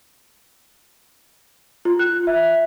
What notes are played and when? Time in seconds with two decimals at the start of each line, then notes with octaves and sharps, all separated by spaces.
1.85 F4
1.99 F#6
2.27 E5